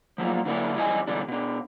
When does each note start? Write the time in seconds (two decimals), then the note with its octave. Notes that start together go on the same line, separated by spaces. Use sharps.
0.18 F3 F#3 A#3 F4
0.45 D3 F#3 A#3 D4 E4
0.75 F2 E3 G3 E4 D#5 G#5
1.07 B2 D3 E3 G3 D4
1.28 B2 D4